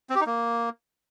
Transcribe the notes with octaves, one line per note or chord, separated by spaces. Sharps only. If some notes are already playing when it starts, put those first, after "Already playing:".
C4
G4
D#4
A#3